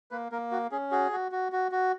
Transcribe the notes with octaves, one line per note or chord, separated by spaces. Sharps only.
A#3 B4
A#3 A#4
F#4
C#4 G#4
F#4 G#4
F#4
F#4
F#4
F#4